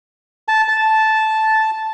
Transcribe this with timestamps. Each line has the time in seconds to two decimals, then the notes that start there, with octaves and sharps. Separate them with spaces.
0.48 A5
0.68 A5